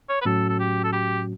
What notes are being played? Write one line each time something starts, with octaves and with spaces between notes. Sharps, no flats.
C#5
B4
A2 F#3 C#4 F#4 A4
A4
G4
A4
G4